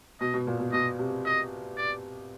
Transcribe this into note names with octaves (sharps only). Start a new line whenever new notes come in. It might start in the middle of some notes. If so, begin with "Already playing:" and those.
B2 D#5
B2
A#2
B2
B2 D#5
C3
D#5
D5